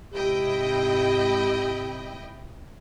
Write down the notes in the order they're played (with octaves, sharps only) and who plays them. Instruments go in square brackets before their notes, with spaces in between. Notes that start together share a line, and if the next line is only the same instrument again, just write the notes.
[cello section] G#2 C3 [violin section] E4 D#5 G5 [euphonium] G4